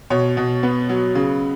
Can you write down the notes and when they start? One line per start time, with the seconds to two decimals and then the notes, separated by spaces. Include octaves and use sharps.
0.10 B2 C#5
0.37 B2
0.63 B3
0.89 F#3
1.15 C#3